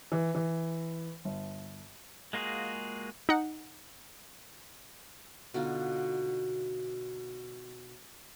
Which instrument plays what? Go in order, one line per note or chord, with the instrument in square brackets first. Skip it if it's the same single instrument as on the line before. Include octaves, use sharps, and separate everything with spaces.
[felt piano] E3
E3
G1
[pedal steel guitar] G#3 A#3 F4 F#4 G#4
[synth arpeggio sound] D#4 F#5
[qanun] B2 D3 D#4 F4